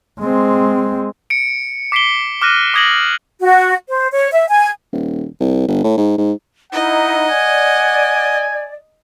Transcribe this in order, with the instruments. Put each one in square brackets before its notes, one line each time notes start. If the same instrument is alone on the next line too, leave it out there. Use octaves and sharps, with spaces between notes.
[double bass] G#3 C4
[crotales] C#7 D7
D6 B6 C7 D7 G7
D6 F6 F#6 A#6 D#7
D6 D#6 G#6 A#6 F#7
[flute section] F#4
C5
C#5
E5
G#5
[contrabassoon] D#1
C2
G1
A2
G#2
G#2
[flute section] D#4 E4 [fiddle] D#5 [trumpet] F#5
[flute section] D5 [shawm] G#5